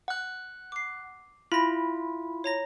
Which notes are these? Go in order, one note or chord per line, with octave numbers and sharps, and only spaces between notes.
F#5 F#6
D6 C7
E4 F4 B5 A#6
C#5 A#5 A#6